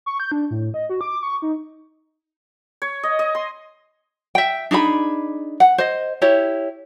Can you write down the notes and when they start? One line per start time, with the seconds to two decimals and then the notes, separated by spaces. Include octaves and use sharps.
0.06 C#6
0.20 G6
0.32 D4
0.51 A2
0.74 D#5
0.89 F#4
1.01 D6
1.23 C#6
1.42 D#4
2.82 C#5
3.03 D#5
3.19 D#5
3.35 C6
4.35 E5 G5
4.71 D4 D#4 G#4 B5
5.60 F#5
5.78 C5 D#5
6.22 E4 G4 C#5